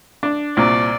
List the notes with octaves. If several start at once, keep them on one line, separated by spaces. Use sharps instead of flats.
D4
C2 A#2 D5